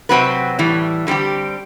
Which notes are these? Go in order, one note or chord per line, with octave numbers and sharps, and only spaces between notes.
C3 F#3 C4 F#4 B4
A2 E3 G3
D3 G3 C4 G4